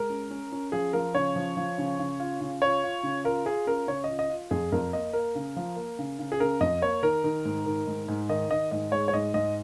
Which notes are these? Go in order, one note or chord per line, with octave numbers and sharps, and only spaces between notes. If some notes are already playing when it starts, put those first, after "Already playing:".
Already playing: G#3 A#4
C#4
C#4
C#4
F3 G#4
F3 A#4
C#3 C#5
F3
F3
C#3
C#3
F4
C#3
F4 C#5
F4
C#3
F4 A#4
F4 G#4
C#4 A#4
C#3 C#5
F4 D#5
D#5
F4
F2 G#4
F2 A#4
A#3 D#5
A#3 A#4
C#3
F3
A#3
C#3
C#3
G#4
C#3 A#4
F2 D#5
A#3 C#5
D#3 A#4
D#3
G#2
D#3
G#2
G#2
D#3 D#5
D#3 D#5
G#2 D#5
G#3 C#5
C#5
G#2 D#5
G#2 D#5